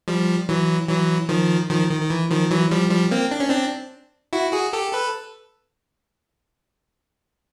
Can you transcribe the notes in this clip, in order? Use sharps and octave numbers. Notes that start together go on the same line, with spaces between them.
F3 G3
E3 F#3
E3 F#3
D#3 F3
D#3 F3
D#3
D#3
E3
D#3 F3
E3 F#3
F3 G3
F3 G3
A#3 C4
D4
C#4
C4 D4
E4 F#4
F#4 G#4
G4 A4
A4 B4